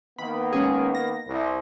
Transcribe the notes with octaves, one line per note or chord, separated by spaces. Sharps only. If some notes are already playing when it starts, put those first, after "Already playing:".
D#3 A#3 B3 B5
G#3 C#4 G#4
A#6
C2